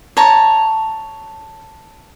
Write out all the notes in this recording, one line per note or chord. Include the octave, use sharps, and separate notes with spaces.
C#5 A5 A#5